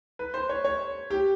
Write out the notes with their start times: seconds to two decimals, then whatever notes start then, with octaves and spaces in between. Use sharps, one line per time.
0.19 B4
0.34 C5
0.49 C#5
0.65 C#5
1.10 G4